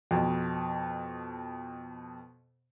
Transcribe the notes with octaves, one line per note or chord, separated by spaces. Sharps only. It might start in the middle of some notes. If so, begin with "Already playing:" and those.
F2 B2